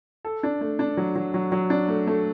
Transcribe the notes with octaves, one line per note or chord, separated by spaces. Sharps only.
A4
D4
A3
D4
F#3
F#3
F#3
F#3
D4
A3
A3